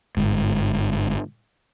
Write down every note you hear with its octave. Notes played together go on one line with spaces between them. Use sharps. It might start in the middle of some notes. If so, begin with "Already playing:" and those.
G1 G#2